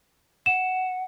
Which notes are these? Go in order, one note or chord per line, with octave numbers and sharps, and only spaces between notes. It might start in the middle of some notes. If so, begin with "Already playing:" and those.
F#5 E7